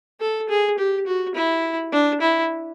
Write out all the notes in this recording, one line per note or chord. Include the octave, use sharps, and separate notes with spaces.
A4
G#4
G4
F#4
E4
D4
E4